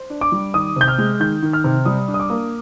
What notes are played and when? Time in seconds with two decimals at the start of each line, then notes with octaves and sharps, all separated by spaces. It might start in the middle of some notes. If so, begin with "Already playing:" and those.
Already playing: C5
0.10 D4
0.21 D6
0.32 G3
0.54 D#3 D#6
0.76 C3 G6
0.88 F6
0.98 G#3
1.20 D#3 G6
1.42 D#3
1.53 F6
1.64 C3
1.85 G3 D#6
2.08 D4
2.14 D#6
2.20 D6
2.30 A#3